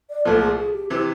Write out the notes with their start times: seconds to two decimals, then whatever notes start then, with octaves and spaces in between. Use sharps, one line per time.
0.10 D5
0.25 C2 A#2 F3 A3 A4
0.41 G#4
0.58 G#4
0.74 G4
0.90 C3 E3 G4